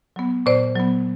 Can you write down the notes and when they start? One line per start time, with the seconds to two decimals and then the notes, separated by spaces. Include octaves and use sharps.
0.16 F#3 B3
0.46 A#2 C5 D5
0.75 F#3 B3